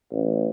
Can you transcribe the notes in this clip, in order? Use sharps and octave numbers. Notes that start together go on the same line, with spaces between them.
A1